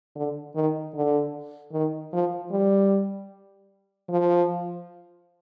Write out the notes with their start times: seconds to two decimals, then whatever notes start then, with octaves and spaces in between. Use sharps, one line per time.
0.15 D3
0.55 D#3
0.94 D3
1.72 D#3
2.13 F3
2.51 G3
4.09 F3